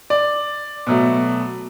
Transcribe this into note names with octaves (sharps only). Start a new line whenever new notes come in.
D5
B2 F#3 A3